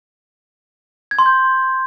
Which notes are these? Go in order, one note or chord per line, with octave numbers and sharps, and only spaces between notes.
G#6
C6
G6